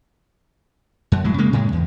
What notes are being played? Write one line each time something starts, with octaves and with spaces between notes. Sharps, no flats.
F#2
A2 F#3 G#3
C#3 G#3 A#3
A2 C#3 G#3
E2